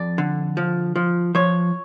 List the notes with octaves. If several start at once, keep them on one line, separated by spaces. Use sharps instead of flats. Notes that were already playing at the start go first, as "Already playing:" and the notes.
Already playing: F2 D5
D3
F3
F3
F3 C#5